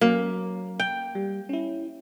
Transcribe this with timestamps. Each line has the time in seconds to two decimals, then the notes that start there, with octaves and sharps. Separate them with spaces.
0.01 F#3 A#3 C#4
0.80 G5
1.15 G3
1.49 C#4 E4